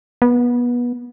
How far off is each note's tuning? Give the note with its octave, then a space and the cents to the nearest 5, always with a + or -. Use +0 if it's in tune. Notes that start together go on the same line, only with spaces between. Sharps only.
B3 -25